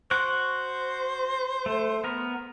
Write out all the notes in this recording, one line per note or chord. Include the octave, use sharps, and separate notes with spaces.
F#4 C5 C#6 F#6
A3
B3 A#4